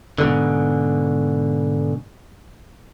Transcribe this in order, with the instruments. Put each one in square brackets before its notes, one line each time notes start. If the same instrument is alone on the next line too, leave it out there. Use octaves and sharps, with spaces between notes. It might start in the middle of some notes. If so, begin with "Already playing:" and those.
[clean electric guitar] G#2 B2 D3